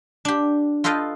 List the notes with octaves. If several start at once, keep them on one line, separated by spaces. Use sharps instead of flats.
D4 G4
F4 A4 B4 D#5 F5 G5